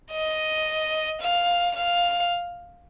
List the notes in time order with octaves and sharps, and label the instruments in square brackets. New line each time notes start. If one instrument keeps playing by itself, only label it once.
[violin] D#5
F5
F5